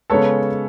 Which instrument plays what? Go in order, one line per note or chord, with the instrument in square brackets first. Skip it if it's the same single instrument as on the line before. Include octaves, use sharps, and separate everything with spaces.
[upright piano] C#3 G#3 B3 A4 C#5